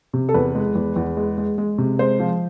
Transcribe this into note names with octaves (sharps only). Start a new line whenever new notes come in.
C3
A4
E2 B4
G#3
E2
E2
G#3
G#3
G#3
C3
G#3 C5
F3